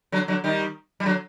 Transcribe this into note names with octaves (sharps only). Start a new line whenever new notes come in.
D3 F#3
D3 F#3
D#3 G3
G3
D3 F#3